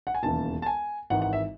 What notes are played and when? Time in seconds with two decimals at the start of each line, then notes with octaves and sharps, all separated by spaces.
0.07 F#5
0.15 G#5
0.23 E1 D#2 C#3 E3 A5
0.62 A5
0.66 G#5
1.10 G#1 G#2 E3 F#5
1.22 F#5
1.33 E5